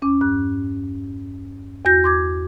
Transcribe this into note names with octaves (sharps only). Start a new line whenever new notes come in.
E2 C#4 D6
G2 F#6
E2 F#4 G6 A#6
C6 D6 G#6